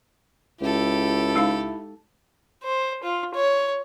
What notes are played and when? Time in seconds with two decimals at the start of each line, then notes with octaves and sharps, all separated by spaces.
0.61 C#2 E4 G4 A4
1.36 G#3 D#4 F5
2.63 C5
3.03 F4
3.34 C#5